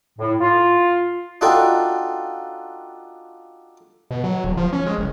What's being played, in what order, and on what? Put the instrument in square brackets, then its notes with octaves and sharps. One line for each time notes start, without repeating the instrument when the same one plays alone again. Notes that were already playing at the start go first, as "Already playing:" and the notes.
[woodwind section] A2
F4
[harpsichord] D4 D#4 F4 F#4 A4 G5
[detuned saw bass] B2
F#3
D1
F3
C#4
G#3
F#1